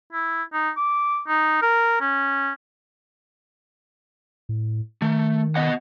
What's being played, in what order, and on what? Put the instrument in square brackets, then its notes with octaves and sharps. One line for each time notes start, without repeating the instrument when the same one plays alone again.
[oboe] E4
D#4
D6
D#4
A#4
C#4
[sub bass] A2
[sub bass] D#3 [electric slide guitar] A3
[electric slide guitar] B3 D#5 F#5